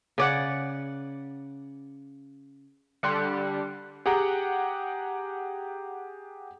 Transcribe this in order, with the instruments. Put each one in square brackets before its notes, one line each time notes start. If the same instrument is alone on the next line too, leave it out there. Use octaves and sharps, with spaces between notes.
[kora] C#3 D5 F#5
[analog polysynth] D3 G3 [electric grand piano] C6 F#6 C#7
[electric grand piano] G4 G#4 F#5 G5 A#5